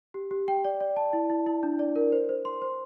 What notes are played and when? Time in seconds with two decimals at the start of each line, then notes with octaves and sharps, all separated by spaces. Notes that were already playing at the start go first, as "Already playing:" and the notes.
0.14 G4
0.31 G4
0.48 G5
0.65 D5
0.81 D5
0.96 A5
1.13 E4
1.30 E4
1.47 E4
1.63 D4
1.79 D5
1.96 A#4
2.12 C5
2.29 C5
2.45 C6
2.62 C5